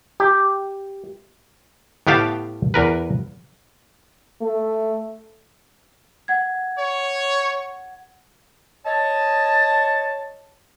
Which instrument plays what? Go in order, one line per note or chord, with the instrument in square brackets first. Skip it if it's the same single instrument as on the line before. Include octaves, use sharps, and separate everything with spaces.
[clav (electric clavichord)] G4
A2 B3 G4 F5 A5
E2 A#4 B4
[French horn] A3
[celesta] F#5 G#6
[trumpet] C#5
[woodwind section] C#5 D#5 A5